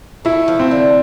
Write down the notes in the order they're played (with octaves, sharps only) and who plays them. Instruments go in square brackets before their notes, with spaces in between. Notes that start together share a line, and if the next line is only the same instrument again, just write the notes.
[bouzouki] A3 [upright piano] E4
[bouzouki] F3
[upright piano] C4
[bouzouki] D3